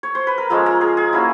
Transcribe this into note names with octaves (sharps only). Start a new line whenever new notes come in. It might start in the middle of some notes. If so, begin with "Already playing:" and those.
C#5
C5
B4
A#4
F3 G#3 C#4 A4
A#4
G#4
G#4
A#3 C#4 E4 F#4